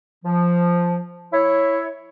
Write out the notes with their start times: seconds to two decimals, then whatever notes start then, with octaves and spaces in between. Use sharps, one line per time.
0.24 F3
1.33 E4 C#5